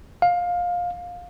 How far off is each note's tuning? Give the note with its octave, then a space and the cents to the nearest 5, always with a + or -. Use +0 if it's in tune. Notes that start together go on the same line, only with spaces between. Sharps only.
F5 +20